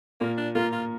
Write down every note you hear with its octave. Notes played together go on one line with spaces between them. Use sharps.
A#2 A#3
D4
A#3 F4
F4